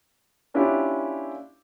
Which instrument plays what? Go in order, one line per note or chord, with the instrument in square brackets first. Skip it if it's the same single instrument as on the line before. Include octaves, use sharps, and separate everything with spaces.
[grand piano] A#3 C#4 D4 E4 F4 G4